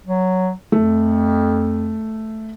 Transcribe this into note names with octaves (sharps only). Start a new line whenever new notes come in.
F#3
F2 A3